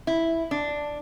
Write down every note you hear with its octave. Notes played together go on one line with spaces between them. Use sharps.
E4
D4